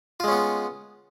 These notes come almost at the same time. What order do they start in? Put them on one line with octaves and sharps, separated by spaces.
F4 G#3 C#4 B3